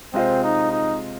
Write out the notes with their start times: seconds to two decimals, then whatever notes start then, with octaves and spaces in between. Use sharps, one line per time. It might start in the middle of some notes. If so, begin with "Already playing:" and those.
0.13 C3 G#3 C4 F4 C5 D#5
0.43 D#4
0.71 D#4